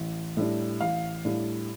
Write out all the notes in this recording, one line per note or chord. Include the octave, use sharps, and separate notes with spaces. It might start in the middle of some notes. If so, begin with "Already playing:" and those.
Already playing: A1
A2 G3 D4
A1 F5
A2 G3 D4